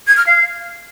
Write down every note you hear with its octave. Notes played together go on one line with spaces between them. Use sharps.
G#6
F6
F5